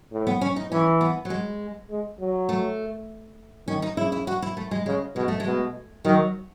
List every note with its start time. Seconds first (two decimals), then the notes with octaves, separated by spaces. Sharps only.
0.12 A2
0.27 B3
0.41 C#4
0.56 D#4
0.71 E3 C#4
1.01 B3
1.25 F#3
1.30 G#3
1.90 G#3
2.20 F#3
2.49 A3
3.67 D#3 C#4
3.82 D#4
3.97 C#3 E4
4.12 E4
4.27 F#4
4.42 E4
4.57 A3
4.71 G#3
4.86 C#3 G#3
5.15 B2 G#3
5.28 A3
5.40 G#3
5.46 B2
6.05 D#3 F#3